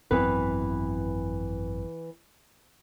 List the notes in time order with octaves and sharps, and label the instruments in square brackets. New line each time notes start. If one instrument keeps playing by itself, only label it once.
[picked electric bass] G#1 F#2 C4 [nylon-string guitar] E3 B3 B4